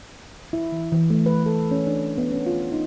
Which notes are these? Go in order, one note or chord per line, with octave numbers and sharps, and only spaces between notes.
E4
E3
E3
A3
B4
A4
C#4
D4
B3
C#4
F4
D#4